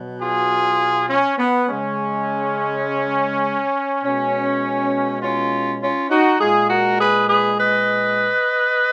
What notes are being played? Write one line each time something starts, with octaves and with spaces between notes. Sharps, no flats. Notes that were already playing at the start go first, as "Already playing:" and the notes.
Already playing: B2 F#3
F4 G#4
C#4
B3
C#3 G#3 C#4
B2 G#3 C#4
C#4 F4
C#4 F4
D#4 F#4
A#2 G#3 F4 G#4
F#4 A#4
G#4 B4
G#4 B4
B4 D#5